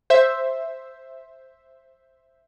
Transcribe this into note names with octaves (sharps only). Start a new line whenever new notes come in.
C5 E5